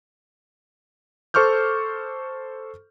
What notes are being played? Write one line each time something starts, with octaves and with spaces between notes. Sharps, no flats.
A4 C5 C#6 D6 F6 G6